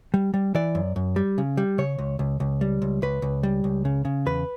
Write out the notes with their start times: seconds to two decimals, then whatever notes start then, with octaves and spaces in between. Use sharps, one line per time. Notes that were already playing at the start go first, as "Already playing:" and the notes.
0.14 G3
0.34 G3
0.55 E3 D5
0.75 F#2
0.96 F#2
1.16 G3
1.38 C#3
1.57 G3
1.78 C#3 C#5
1.98 C#2
2.19 C#2
2.40 C#2
2.61 G3
2.82 C#2
3.02 C#2 B4
3.22 C#2
3.43 G3
3.64 C#2
3.85 C#3
4.05 C#3
4.26 E2 B4